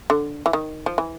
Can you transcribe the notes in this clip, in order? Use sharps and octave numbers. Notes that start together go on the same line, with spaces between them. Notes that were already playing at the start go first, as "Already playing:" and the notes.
D3
E3
D#3
F3
E3